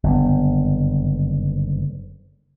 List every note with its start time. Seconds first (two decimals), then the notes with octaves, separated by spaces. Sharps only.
0.03 F#1 G2 D3 B3